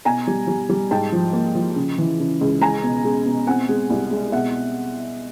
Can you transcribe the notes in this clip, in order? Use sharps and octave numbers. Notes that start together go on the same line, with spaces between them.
B2 G#5 A#5
G3
G3
G3
G#2 G5 A5
F3
A#3
F3
C#3
E3
C#3
C#2
G#3 G#5 A#5
B2
G#3
B2
C4 F#5 G#5
G#3
C2
G#3
B2 E5 F#5